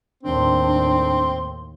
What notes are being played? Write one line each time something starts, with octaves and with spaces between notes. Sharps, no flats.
D#2 A2 C4 D4 C6